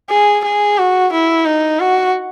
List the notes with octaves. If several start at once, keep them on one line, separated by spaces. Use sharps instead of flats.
G#4
G#4
F#4
E4
D#4
F#4